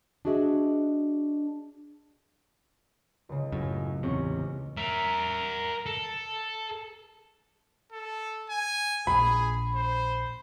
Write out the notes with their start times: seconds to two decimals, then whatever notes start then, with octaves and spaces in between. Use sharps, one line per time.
0.25 D4 F#4 G#4 D#5 E5
3.29 C#2 C#3
3.52 F#2 A2
4.03 A1 E2 C3 C#4 C#6
4.77 A#4 E5
5.86 A4
7.92 A4
8.50 G#5
9.07 A#1 G#4 B5
9.74 C5